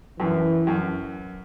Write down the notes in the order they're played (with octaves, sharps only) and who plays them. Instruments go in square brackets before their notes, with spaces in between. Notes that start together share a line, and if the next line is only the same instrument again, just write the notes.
[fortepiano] F#2 [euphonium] E3
[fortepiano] F#2